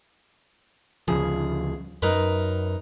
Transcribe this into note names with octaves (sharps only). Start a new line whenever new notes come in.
D2 C#3 F3 G#4
F#2 D#4 A#4 B4